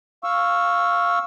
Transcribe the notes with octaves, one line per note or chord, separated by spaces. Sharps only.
F5 C#6 E6